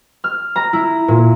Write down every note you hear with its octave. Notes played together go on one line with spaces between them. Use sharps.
F6
A#5
E4
A#2